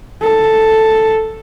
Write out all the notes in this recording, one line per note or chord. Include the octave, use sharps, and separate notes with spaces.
A4